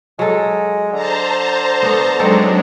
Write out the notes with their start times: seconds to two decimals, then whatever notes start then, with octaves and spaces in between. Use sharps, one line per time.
0.19 F#3 G#3 A4
0.93 D3 C5 A5 A#5
1.83 A3 B3
2.19 F#3 G#3 C4 D4 D#4 A4